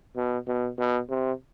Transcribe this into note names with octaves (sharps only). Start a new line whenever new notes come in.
B2
B2
B2
C3